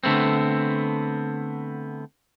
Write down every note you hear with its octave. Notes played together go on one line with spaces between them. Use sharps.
D3 A3 B3 C4